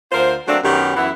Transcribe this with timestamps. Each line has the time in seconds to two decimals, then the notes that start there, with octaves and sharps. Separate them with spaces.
0.12 D2 F4 A#4 C5
0.47 F#3 A3 A#3 C4 D4
0.63 F#2 D#3 B3 C#4 G4
0.97 F#2 E3 B3 E4 E5 F#5